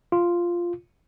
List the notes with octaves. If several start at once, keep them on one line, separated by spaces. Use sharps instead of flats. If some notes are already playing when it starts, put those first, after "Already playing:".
F4